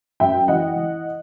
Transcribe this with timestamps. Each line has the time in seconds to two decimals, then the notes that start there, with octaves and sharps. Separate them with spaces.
0.20 F#2 E5 G5
0.48 E3 D#5 F#5
0.76 E3